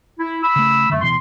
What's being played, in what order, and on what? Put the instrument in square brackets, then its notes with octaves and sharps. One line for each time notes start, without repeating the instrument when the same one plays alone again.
[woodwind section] E4
B5 E6
[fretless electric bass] C#3 A3
[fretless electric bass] F#2 D3 [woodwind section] A3
[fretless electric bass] D1 B2 E3 [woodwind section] C6